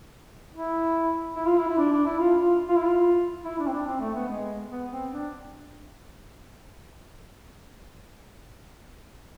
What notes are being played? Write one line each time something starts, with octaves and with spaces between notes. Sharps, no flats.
E4
E4
F4
E4
E4
D4
D4
E4
F4
F4
F4
E4
F4
E4
D4
C4
D4
C4
A3
B3
G#3
B3
C4
D4